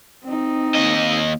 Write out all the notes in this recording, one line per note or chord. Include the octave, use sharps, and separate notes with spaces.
C4 D#4
D#2 D#5